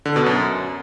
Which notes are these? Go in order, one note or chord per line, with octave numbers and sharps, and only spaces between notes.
D3
B2
F#2